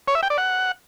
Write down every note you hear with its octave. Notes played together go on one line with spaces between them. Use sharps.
C#5
E5
G5
D5
F#5